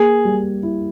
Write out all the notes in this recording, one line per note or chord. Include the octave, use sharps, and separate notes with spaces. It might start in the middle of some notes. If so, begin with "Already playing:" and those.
Already playing: A#3 G#4
G3
E4